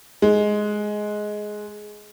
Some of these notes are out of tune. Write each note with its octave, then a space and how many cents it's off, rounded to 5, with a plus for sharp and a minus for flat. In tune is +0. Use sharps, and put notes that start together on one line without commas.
G#3 +10